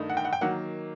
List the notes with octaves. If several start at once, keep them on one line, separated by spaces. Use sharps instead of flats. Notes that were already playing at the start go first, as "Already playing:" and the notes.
Already playing: G2 D#3 A3 D#4
F#5
G5
F#5
G5
D#3 F#3 A#3 F#5